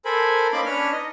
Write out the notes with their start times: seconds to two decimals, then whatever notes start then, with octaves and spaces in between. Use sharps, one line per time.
0.05 A4 A#4 C5 G#5 B5
0.53 A#3 C#4 D#4 B5 C6 D6
0.66 C#4 D4 B4 C#5 F6
0.92 D#4 D#5